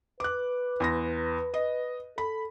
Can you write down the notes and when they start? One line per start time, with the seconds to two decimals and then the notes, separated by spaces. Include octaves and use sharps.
0.20 B4 D6 F#6
0.80 E2 C6 A#6
1.54 D#5
2.18 A4 B5